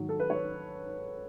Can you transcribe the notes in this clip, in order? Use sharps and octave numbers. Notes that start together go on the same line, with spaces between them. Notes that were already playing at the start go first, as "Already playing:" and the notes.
Already playing: G#2 D#3 F#3
A4
B4
C#5